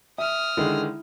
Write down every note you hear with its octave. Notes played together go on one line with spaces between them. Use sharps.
E5 D#6 F6
D3 D#3 G#3 E4